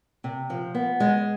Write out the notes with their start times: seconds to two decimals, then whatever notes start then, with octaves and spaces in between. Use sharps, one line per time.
0.24 C3
0.50 F3
0.75 B3
1.00 G#3